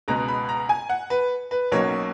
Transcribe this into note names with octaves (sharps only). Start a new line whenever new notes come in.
C#2 B2 G#3 B3 A#5
B5
A#5
G#5
F#5
B4
B4
B1 B2 F#3 A#3 C#4 C#5